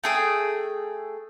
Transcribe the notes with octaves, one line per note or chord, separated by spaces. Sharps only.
A3 G#4 G5